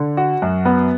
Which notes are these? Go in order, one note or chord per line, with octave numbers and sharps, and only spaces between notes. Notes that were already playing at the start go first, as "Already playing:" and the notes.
Already playing: D3
F#4
F#2
B3